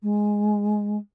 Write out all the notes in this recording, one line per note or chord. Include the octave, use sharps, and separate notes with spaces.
G#3